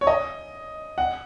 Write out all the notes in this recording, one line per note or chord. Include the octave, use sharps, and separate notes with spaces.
C#5
D#5
F#5